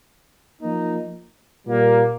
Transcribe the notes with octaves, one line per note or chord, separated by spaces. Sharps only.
F3 A#3 D#4
A#2 G3 A#3